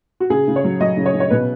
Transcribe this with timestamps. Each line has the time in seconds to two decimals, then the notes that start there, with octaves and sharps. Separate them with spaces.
0.20 F#4
0.30 C#3 G#4
0.48 C#3
0.56 C#5
0.64 F#3
0.81 F#3 D#5
0.97 C#3
1.06 C#5
1.14 C#3
1.20 C#5
1.30 B2 B4